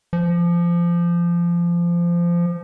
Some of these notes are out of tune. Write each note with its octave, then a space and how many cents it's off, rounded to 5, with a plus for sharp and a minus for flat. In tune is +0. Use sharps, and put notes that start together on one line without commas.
F3 -20